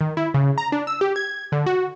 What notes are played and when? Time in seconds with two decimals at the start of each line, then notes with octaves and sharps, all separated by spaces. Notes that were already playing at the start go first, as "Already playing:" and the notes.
0.01 D#3
0.17 E4
0.34 C#3
0.58 A#5
0.72 D4
0.87 E6
1.01 G4
1.16 G#6
1.52 D3
1.66 F#4